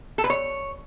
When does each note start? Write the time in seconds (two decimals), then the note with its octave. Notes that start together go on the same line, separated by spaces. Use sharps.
0.18 A4
0.24 B4
0.30 C#5